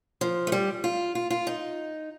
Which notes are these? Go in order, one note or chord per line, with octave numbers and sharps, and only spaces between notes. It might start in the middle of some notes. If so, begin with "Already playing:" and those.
F3
A3
G3
F4
F4
F4
D#4